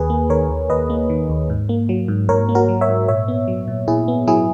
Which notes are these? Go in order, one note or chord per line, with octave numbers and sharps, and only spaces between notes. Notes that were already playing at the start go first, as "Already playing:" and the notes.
Already playing: D#2 G#4 B4
A#3
D#3 A#4 C#5
D#2
D#2 B4 D#5
A#3
D#3
D#2
G#2
A#3
F#3
G#2
G#2 A#4 C#5
A#3
F#4 A#4
F#3
C#5 E5
G#2
A#2 C#5 E5
B3
F#3
A#2
A#2 E4 G#4
B3
F#3 E4 G#4